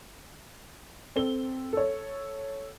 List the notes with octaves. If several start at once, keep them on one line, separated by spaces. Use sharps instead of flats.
C4 A4 G7
A4 C#5